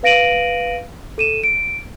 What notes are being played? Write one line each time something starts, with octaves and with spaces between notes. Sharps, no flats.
B4 F5 A#6 D7 D#7 F#7
A4 D#7 E7
D7